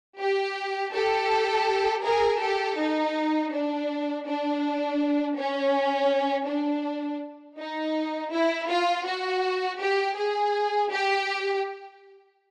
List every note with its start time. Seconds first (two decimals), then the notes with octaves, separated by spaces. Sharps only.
0.19 G4
0.92 G4 A4
2.03 G#4 A#4
2.40 G4 A4
2.77 D#4
3.51 D4
4.25 D4
5.36 C#4
6.46 D4
7.57 D#4
8.30 E4
8.68 F4
9.04 F#4
9.79 G4
10.15 G#4
10.89 G4